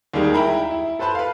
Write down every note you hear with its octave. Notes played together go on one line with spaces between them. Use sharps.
D#2 D#3 G3 G#3
E4 G5 A#5 B5
E4
A4 B4 C5 A5 B5
B4 F5